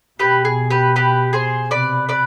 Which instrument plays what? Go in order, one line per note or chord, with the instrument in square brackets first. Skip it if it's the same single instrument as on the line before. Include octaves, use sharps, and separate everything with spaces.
[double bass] B2 [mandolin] G4 B4
[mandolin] G#4
G4 B4
G4 B4
G#4 C5
[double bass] C3 [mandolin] B4 D5
[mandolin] B4 D5